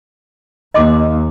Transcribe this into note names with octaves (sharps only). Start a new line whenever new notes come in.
D#2 D#5 C6 D6